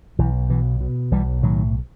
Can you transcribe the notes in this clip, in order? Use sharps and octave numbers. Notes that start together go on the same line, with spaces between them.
B1 E3
B2 E3
B2
B1 E3 G3
A2 D#3 F#3